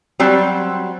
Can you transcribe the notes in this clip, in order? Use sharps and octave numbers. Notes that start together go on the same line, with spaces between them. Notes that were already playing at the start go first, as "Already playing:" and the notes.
F#3 G3 C4